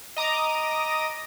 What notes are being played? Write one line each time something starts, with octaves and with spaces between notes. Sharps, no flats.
D#5 A#5 D6 D#6